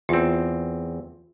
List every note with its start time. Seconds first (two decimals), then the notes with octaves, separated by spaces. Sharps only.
0.09 E2 C4 F4